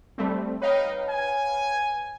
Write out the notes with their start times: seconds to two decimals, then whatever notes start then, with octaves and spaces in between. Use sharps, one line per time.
0.18 G3 A3 C4
0.62 D#4 B4 C#5 F5 G5
1.08 G#5